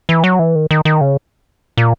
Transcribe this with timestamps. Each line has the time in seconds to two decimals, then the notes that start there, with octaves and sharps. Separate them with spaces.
0.09 E3
0.24 F#3
0.39 E3
0.55 D#3
0.71 D#3
0.85 D#3
1.01 C#3
1.77 A#2